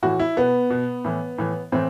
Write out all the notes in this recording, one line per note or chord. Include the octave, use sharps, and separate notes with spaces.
A2 E3 F#4
E4
B2 B3
B2
A2 E3
A2 E3
A2 E3 C4